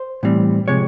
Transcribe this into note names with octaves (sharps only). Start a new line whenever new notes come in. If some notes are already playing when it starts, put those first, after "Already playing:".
Already playing: C5
A2 E3 G3 C4
C3 F3 G#3 C#5